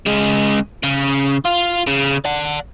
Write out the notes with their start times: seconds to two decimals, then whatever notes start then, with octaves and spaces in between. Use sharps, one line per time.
0.06 C#3 G#3
0.83 C#3
1.45 F4
1.87 C#3
2.25 D5 F#5